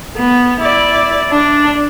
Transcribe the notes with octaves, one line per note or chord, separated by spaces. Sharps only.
B3
E4 D5
D4